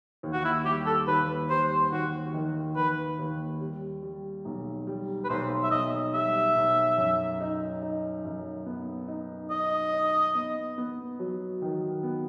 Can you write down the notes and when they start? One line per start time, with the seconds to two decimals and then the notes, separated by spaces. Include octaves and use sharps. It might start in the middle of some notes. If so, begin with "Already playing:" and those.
0.23 D#2
0.33 F#4
0.45 E4
0.65 G3 G4
0.86 A4
1.07 D#2 B4
1.50 G3 C5
1.92 D#2 F#4
2.34 D#3
2.76 D#3 B4
3.19 D#2
3.61 G3
4.03 G3
4.45 B1
4.87 G3
5.24 B4
5.29 B1 C5
5.64 E5
5.71 B1 D#5
6.14 G3 E5
6.56 B1
6.98 F#2
7.41 D#4
7.82 D#4
8.24 F#2
8.66 B3
9.08 D#4
9.50 D#4 D#5
9.93 D#4
10.35 B3
10.78 B3
11.19 F#3
11.62 D#3
12.03 B3